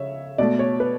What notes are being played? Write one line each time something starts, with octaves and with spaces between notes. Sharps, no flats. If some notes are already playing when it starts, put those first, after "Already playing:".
Already playing: C#3 C#5 E5
B2 A3 D5
C#5
B4